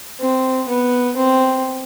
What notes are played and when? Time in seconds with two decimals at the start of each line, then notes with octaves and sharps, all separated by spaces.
0.20 C4
0.68 B3
1.16 C4